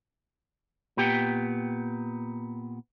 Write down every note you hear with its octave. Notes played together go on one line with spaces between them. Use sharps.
A#2 B3 G4 G5